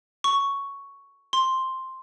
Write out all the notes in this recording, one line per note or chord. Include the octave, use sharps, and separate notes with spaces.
C#6
C6